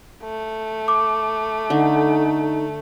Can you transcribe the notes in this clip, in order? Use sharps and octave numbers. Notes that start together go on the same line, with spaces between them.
A3
D6
D3 D#4